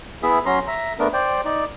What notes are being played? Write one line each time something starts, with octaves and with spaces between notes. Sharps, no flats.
B3 E4 G#4 E5
F#3 C#4 A#5 C6
E5 A#5
A3 B3 D4 A#4
C5 D5 G5
D#4 D5